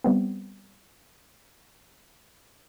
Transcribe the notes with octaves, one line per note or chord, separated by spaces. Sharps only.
G3 B3 C4